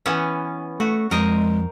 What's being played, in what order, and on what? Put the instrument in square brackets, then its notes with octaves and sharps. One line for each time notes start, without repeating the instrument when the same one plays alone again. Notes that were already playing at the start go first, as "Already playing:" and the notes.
[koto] E3 B3 C#4
[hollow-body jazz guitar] A3 [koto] F#4
[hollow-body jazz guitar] F2 [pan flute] G#3 [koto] A#4 C5 D#5